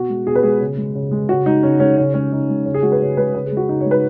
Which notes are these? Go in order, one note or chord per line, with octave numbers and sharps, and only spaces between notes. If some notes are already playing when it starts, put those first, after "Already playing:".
Already playing: B2 F#4
G#3
B2 G#4
B4
G#3 G#4
C#3
G#3
C#3
G#3
C#3 F#4
G#3 D#4
C#3 C#4
G#3 C#4
C#3 C#4
G#3 C#4
C#3 D#4
G#3
C#3 C#4
G#4
G#3 F#4
B4
C#3 C#5
G#3 B4
C#3 B4
G#4
G#3
F#4
C#3 D#4
G#3 C#5
B4